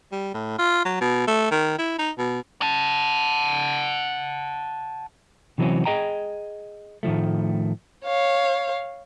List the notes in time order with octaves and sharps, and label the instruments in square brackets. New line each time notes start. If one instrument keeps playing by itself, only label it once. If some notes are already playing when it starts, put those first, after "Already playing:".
[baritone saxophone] G3
A2
F4
F#3
B2
A3
D#3
E4
D#4
B2
[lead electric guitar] F#5 A5
[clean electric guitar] C3 E3 F#3 G3 C4 C#4
G#4 D#5 G5 A#5
A2 D#3 F3 A3
[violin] C#5 F5